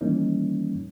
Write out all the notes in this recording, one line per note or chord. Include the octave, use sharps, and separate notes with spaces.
D#3 E3 G3 A#3 C#4 D#4